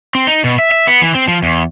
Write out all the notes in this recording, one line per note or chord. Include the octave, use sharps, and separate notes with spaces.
C4
D#4
B2
E5
E5
B3
E3
C4
F3
E2